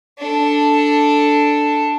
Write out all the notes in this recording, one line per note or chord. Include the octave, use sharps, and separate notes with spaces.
D4 A4